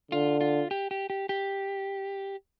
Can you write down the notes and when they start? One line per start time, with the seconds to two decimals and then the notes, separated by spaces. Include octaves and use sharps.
0.11 D3 F4
0.41 F4
0.71 G4
0.91 G4
1.10 G4
1.29 G4